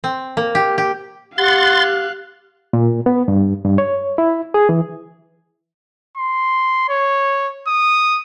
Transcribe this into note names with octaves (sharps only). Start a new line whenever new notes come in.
C4
A#3
G4
G4
G4 F5 F#5 C6 F#6 A6
A#2
B3
G2
G2
C#5
E4
G#4
E3
C6
C#5
D#6